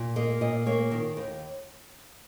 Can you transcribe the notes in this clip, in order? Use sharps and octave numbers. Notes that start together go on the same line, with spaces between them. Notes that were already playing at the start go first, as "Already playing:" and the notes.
Already playing: A#2
A#3 D#5
A#2 D#5
A#3 C#5
D#3
D#2